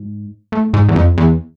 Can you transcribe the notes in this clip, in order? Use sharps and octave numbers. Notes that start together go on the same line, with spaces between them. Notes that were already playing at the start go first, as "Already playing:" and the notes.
Already playing: G#2
A2
G#2
E2
F2
E2